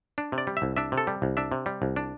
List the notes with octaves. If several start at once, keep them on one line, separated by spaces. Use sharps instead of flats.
D4
C3
D5
G3
E5
C2
D4 E5
C3
A4
G3
C2
D4 E5
C3
G3
C2
D4